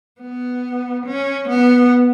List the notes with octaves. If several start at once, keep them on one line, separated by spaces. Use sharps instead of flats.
B3
C#4
B3